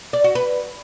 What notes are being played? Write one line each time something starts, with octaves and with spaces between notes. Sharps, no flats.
D5
F#4
B4